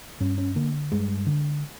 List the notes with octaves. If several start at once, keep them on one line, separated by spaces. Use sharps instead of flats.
G2 C#4
C#4
D3 A#3
G2 G#3
D3